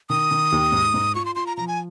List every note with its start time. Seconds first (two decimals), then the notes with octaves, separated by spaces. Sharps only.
0.09 D#3 D#6
0.31 D#3
0.52 D#2
0.72 G#2
0.94 G#2
1.15 F4 C#6
1.25 C6
1.35 F4 C6
1.47 A#5
1.57 F3 A#5
1.68 G#5